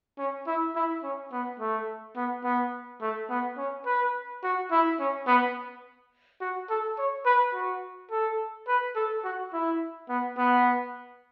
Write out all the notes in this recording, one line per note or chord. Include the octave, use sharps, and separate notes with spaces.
C#4
E4
E4
C#4
B3
A3
B3
B3
A3
B3
C#4
B4
F#4
E4
C#4
B3
F#4
A4
C#5
B4
F#4
A4
B4
A4
F#4
E4
B3
B3